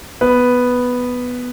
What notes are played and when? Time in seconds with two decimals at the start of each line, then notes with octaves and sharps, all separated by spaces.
0.21 B3 B4